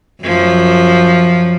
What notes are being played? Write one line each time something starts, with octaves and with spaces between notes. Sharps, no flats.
F#2 F3